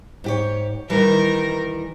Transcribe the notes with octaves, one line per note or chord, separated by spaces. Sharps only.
G#2 G4 C#5
D#3 E3 G3 A#4